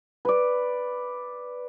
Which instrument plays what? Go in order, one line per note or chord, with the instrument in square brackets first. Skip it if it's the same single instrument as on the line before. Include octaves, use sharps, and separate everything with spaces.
[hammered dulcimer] B4 D5